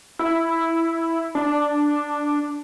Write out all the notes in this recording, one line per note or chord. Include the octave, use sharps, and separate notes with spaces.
E4
D4